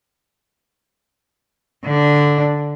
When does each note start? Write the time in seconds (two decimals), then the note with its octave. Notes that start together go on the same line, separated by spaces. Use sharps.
1.85 D3 D4